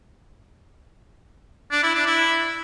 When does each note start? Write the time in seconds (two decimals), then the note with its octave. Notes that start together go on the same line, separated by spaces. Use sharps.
1.71 D4
1.83 E4
1.95 D4
2.06 E4